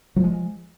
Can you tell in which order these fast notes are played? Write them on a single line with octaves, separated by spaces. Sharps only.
F#3 F3 G#3